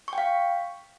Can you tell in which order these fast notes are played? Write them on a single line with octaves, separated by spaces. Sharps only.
C#6 G5 F5